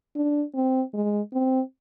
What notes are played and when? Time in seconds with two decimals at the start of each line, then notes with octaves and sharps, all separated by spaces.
0.16 D4
0.55 C4
0.94 G#3
1.33 C4